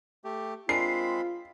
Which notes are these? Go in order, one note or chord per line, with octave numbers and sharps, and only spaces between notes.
A3 G4
G#3 C4 D4 F4 G#4 A#4 B5 C7